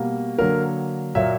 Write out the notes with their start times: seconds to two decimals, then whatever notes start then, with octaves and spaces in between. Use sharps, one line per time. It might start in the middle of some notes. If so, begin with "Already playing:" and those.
Already playing: B2 G3 A#3
0.38 D3 F#3 A#3 A#4
1.15 A#2 F#3 A#3 E5